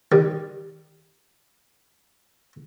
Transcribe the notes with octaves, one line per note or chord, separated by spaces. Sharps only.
D#3 G3 G4